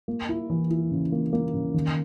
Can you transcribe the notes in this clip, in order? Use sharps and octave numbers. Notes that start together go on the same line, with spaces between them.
A#3
E4
E3
E4
C#3
A#3
A#3
C#3
D#3